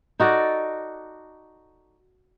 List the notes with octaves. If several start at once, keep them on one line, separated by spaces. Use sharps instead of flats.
D#4 F#4 A4 D5